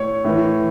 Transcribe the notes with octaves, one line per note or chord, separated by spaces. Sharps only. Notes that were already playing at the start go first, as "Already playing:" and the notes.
Already playing: A2 C#5
A2 E3